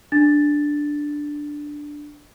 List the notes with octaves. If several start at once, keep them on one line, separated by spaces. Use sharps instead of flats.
D4 A6